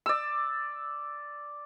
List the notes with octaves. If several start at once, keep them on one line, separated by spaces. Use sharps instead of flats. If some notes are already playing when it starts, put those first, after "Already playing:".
D5 E6